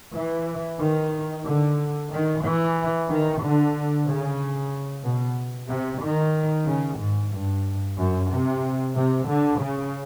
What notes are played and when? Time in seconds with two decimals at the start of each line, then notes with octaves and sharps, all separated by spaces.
0.15 E3
0.80 D#3
1.45 D3
2.11 D#3
2.43 E3
3.08 D#3
3.41 D3
4.06 C#3
5.04 B2
5.69 C3
6.02 D#3
6.68 C#3
6.99 G#2
7.32 G2
7.97 F#2
8.30 C3
8.95 C3
9.28 D3
9.61 C#3